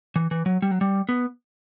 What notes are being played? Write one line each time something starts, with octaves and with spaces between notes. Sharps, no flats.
E3
E3
F#3
G3
F#3
G3
B3